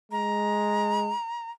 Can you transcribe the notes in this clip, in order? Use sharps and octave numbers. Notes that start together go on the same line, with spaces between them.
G#3 A#5